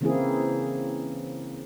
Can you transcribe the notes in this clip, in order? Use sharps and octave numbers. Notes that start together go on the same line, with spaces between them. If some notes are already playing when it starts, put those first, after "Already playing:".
C#3 E3 A#3 C4 E4 G#4